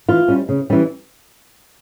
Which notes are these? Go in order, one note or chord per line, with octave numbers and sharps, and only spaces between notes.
E3 F4
G3 C#4
C#3
E3 G3 C#4